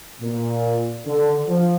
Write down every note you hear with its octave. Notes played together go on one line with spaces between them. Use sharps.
A#2
D3
F3